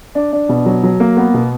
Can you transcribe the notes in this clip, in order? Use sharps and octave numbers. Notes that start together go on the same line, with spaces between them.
D4
D4
B2
F#3
F#3
A#3
B3
B2